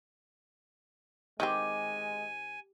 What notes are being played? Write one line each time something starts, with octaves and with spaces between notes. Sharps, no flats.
D#3 G#3 C4 G4 G5 G#5